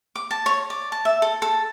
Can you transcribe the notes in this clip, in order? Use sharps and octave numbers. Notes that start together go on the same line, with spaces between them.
D6
A5
C#5
D5
A5
E5
A4
A4